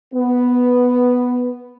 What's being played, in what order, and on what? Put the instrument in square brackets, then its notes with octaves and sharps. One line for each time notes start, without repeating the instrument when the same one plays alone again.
[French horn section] B3